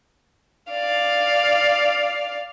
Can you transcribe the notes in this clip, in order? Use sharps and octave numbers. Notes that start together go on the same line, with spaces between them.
D5 F5